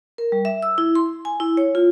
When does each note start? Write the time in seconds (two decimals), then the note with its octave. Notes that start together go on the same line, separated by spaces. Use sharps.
0.18 A#4
0.32 G3
0.45 E5
0.63 E6
0.78 E4
0.95 C6
1.25 G#5
1.40 E4
1.57 C#5
1.75 F4